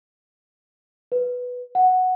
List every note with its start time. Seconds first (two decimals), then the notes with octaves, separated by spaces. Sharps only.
1.12 B4
1.75 F#5